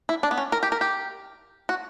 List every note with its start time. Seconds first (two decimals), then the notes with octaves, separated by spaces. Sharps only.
0.09 E4
0.23 D4
0.31 B3
0.37 C#4
0.52 A#4
0.63 G4
0.72 A#4
0.81 G4
1.69 F#4